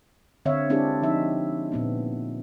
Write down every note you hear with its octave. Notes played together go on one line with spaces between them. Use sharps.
D3 C4 C#5 E5 F5
G#3 C4 D4 E4 G4 G#4
F3 D#4 E5
A#2 B3 C4